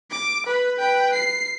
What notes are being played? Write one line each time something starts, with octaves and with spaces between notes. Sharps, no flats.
D6
B4
B4 G5
C7